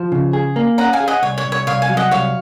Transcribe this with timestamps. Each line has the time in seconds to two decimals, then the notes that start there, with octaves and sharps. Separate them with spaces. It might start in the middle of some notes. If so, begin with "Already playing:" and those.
Already playing: F3 C5
0.12 C#3
0.33 G#4
0.56 A#3
0.78 C#4 F#5 A#5
0.93 F5 G#5
1.00 G#4
1.08 D#5 F#5
1.22 C2 C#5
1.38 C#5
1.45 C2
1.52 C#5
1.67 C2 C#5 F5
1.82 F5 G#5
1.90 F#3
1.97 D#5 F#5
2.11 C2 C#5 F5